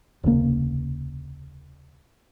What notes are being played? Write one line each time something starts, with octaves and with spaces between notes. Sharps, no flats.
D#1 C2 C#3 A#3